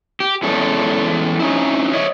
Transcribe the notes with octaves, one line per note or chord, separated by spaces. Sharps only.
G4
E2 E3 G#3 C#4 A4
C#4 D#4 E4
C#5 D#5 E5